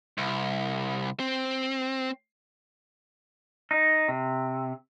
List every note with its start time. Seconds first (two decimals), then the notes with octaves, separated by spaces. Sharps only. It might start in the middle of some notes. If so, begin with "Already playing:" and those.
0.18 C2
1.20 C4
3.71 D#4
4.08 C3